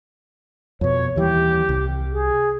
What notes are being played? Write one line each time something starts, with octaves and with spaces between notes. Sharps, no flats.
F2 B2 C#5
D#2 E3 G3 G4
C2
G#4